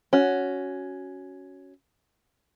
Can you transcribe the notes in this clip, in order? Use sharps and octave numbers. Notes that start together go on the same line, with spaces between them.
C#4 F#4